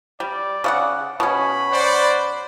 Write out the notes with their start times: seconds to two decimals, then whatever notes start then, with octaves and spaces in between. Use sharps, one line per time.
0.20 G3 D5
0.64 C#3 F4 F#5
1.20 B2 C#4 B5
1.71 C5 D5 F#5